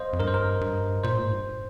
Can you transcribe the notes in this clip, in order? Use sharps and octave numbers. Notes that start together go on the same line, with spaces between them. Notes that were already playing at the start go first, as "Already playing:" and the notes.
Already playing: C5 D#5 F5
F2
G2 A#4
C5
A#4
G2
A#2 C5
G#2
G2